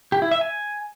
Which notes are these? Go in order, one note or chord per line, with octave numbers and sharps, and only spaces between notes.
G4
E4
E5
G#5